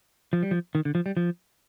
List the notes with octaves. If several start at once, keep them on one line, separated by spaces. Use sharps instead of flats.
F3
G3
F3
D#3
D3
F3
G3
F3